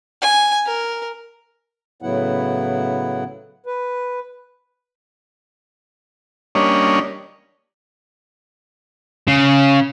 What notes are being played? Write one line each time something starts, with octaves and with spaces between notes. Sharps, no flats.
G#5
A#4
A2 C#3 F#3 B3 E4 F#5
B4
G3 A#3 C#4 D4 C#5 D#5
C#3